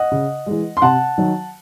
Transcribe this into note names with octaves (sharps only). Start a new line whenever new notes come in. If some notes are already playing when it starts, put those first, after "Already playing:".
Already playing: D#5 F#5
C#3
E3 G#3
C6
C3 F#5 A5
D#3 F#3